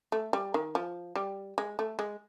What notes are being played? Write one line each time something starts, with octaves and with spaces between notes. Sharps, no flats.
A3
G3
D#3
F3
G3
G#3
A3
G#3